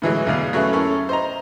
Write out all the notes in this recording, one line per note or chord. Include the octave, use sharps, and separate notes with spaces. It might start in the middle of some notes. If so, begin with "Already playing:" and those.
A2 E3 F#3 G#3
E2 B2 F5
F#3 A3 C#4 G#4 B4 E5
C#4 E4 A4 A#4
C5 D#5 A#5